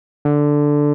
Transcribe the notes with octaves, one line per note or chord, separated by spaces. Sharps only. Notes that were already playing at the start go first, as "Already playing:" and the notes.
D3